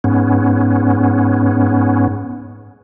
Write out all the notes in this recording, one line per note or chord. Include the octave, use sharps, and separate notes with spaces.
G#2 B3 C#4